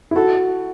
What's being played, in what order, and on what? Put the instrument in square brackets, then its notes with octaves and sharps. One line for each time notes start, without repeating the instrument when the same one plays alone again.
[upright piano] E4
[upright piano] F#4 [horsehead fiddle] A4